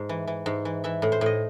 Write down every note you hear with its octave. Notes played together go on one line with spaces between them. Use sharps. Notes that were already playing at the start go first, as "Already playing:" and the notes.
Already playing: G#2
E3
E3
G#2
E3
E3 E5
A2
C5
A2 D#5